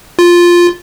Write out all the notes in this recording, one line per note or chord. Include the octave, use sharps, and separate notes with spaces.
F4